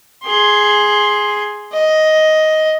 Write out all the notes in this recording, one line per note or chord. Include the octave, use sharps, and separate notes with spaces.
G#4 C6
D#5